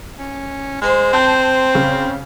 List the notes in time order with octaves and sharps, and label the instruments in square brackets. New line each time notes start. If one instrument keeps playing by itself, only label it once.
[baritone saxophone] C#4
[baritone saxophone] G#3 [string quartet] C5
[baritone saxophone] C4 [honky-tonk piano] A5 G6
[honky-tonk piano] C#3